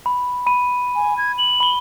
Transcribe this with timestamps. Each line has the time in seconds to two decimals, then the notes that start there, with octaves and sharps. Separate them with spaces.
0.06 B5
0.46 B5 D#7
0.96 G#5
1.18 G#6
1.38 F#7
1.60 B5 G7